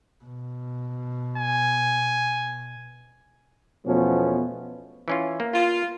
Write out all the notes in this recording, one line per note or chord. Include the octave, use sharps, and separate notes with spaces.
B2
G#5
E2 B2 F3 A3 B3 C#4
E3 C#4 F4
A#3
F4